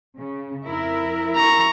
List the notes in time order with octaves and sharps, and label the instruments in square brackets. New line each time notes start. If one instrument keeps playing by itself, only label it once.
[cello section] C#3
F2 E4 A#4
[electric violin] A#5 C#6